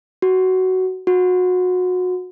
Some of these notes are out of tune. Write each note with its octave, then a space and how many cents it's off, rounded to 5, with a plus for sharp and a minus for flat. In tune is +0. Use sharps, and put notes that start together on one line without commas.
F#4 +15
F#4 -25